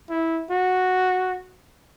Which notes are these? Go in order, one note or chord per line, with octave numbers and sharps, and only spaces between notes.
E4
F#4